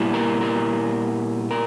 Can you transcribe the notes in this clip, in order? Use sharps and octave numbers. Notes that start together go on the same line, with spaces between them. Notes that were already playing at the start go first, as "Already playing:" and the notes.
Already playing: A#2 G3 B3 E4
A#4
A#4
A#4